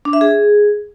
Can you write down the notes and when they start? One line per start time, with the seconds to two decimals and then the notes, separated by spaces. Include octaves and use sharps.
0.05 D4
0.13 E5
0.21 G#4